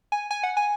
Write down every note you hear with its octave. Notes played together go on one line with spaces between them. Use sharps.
G#5
G#5
F#5
G#5